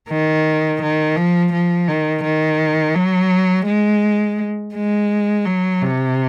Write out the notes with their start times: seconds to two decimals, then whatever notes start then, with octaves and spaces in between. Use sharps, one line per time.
0.10 D#3
0.82 D#3
1.16 F3
1.52 F3
1.88 D#3
2.24 D#3
2.95 F#3
3.66 G#3
4.74 G#3
5.45 F#3
5.81 C3